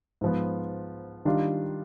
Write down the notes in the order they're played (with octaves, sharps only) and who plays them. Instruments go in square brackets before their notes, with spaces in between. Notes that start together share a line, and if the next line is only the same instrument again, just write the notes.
[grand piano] G#2 F3 B3
D#3 G3 D4 F4